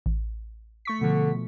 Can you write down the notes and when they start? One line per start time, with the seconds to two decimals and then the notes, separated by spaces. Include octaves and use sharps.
0.06 A1
0.85 A3 C#6 B6
1.01 B2 D3 F3